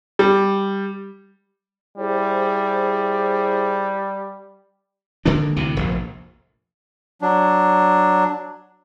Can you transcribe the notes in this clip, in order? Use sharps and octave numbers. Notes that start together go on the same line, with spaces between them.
G3
G3 E4 G#4 C5
D3 G#3 A#3 D4
D2 C3 E3
F1 A#1
F#3 D4